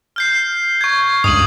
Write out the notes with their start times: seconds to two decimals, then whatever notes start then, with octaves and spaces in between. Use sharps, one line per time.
0.16 F6 G6 C7
0.81 C#6 G#6
1.24 C#2 G2 D#6 D#7 F#7